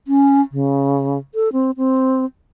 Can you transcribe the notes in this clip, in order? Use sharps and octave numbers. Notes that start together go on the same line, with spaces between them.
C#4
C#3
A4
C4
C4